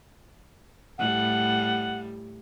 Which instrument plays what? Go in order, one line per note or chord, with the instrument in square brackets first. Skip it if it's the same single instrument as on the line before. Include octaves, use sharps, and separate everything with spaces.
[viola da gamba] A2 G3 [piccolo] F#5